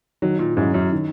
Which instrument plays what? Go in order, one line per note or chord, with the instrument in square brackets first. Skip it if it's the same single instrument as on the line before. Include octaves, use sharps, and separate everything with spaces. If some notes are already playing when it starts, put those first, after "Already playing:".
[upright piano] D#3 [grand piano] F#3
[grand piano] A#2
[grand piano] G#2 [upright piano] F#3 C#4 E4
[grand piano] F#2
[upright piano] D#3